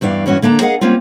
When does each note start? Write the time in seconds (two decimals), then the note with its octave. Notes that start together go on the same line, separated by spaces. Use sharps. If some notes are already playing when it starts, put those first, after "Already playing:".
0.01 E2 G2 E3 D5 F5
0.26 G2 E3 C#4 F#4
0.42 D3 A#3 D4 A#5
0.61 G#4 A#4 D#5 F5 F#5
0.81 G3 A#3 C4 C#4 F4